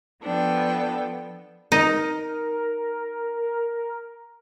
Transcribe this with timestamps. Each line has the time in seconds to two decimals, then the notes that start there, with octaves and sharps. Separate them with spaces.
0.22 F3 B3 D4 A4 G5
1.72 D#4 A#4